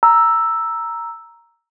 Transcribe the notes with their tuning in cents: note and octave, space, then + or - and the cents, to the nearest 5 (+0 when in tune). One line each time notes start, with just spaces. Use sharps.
A#5 +0 E6 +0